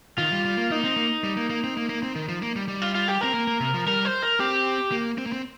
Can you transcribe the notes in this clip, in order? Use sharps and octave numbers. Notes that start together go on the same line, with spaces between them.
D#3 F4
G3
G3
A#3
A#3 D#4
C4
A#3
G3
A#3
A#3
C4
A#3
A#3
C4
D#3
F3
A#3
G3
G3
F4
F4
G4
C4 A#4
A#3
A#3
C3
F3
G3 A#4
C5
A#4
C4 G4
A#3
C4
A#3
C4